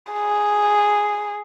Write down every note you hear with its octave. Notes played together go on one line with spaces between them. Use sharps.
G#4